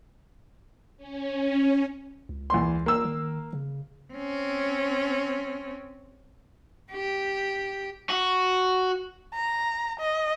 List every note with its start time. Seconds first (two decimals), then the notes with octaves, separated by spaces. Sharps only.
0.97 C#4
2.29 C#2
2.50 E2 C6
2.86 A#3 E6
3.05 D#3
3.53 C#3
4.13 C4 C#4
6.92 G4
8.10 F#4
9.34 A#5
10.00 D#5